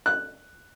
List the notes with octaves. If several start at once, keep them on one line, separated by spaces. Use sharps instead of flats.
F#6